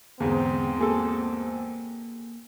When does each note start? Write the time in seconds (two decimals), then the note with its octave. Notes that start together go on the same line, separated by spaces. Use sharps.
0.20 E2 G#2 D3 C4 G#4 F5
0.79 A#3 F#4 G#4 A4 E6